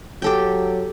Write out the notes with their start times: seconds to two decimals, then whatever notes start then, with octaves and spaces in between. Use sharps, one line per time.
0.22 F#3 G4 A4 G5